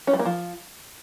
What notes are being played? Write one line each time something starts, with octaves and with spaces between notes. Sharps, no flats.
C#4
G3
A#3
F3